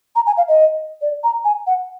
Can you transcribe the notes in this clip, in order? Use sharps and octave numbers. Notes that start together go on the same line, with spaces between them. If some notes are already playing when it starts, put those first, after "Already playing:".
A#5
G#5
F5
D#5
D5
A#5
G#5
F#5